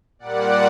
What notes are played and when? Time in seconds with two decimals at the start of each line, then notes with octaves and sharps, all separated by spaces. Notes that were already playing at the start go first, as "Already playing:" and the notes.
0.19 A#2 G3 A#3 D5 F#5